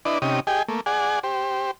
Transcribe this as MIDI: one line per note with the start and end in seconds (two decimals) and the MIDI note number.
0.05 0.19 62
0.05 0.19 64
0.05 0.19 71
0.05 0.19 74
0.05 0.19 75
0.22 0.40 48
0.22 0.40 61
0.22 0.40 63
0.22 0.40 67
0.22 0.40 87
0.47 0.63 67
0.47 0.63 68
0.47 0.63 75
0.47 0.63 79
0.47 0.63 80
0.68 0.81 57
0.68 0.81 58
0.86 1.19 68
0.86 1.19 74
0.86 1.19 78
0.86 1.19 80
1.23 1.71 67
1.23 1.71 72